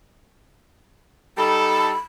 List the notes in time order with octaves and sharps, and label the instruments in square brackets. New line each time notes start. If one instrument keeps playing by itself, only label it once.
[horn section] G3 D#4 A4 [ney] B5